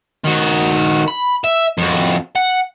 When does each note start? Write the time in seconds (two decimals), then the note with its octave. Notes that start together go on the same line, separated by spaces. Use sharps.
0.24 D#3 F#4
1.08 B5
1.44 E5
1.78 F2 F#4
2.36 F#5